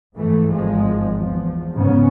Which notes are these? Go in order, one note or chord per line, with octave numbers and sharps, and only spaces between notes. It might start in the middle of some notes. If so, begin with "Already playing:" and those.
G#2 E3 A3
G#1 F3 G#3
E2 F3
G#2 C#3 B3 C#4